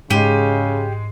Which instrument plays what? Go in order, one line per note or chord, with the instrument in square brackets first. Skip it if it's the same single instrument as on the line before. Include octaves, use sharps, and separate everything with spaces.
[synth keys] G#2 [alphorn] C#3 [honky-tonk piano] G#3 D#7 [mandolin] G4